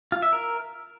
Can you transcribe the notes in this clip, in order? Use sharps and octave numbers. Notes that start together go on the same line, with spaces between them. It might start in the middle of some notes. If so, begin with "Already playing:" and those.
F4
E5
A#4